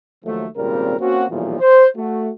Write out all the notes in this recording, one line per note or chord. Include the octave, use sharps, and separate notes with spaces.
D#2 D#3 F3 F#3 A3
G#1 A#2 C#3 G3 C4 A#4
A#3 C4 C#4 F#4
B1 E2 A#2 E3 F3 G3
C5
A3 F#4